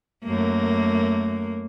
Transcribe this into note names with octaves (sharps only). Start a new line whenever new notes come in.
F#2 A3 A#3